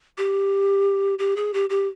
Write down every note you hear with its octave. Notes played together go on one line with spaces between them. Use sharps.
G4
G4
G#4
G4
G4